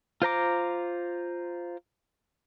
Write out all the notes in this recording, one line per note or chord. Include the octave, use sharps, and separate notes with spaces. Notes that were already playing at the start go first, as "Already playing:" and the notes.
F4 C5 A#5 D6